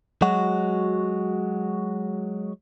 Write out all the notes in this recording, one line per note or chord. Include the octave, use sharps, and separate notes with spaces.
F#3 G#3 F#4